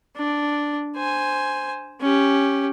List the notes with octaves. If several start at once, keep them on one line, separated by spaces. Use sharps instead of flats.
D4
C5 G#5
C#4 G4